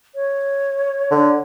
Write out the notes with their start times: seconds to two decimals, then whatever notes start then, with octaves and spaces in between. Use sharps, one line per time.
0.15 C#5
1.11 D3